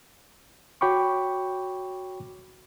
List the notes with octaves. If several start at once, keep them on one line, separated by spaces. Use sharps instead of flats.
F#4 C#5 G5 B5 C#6 D6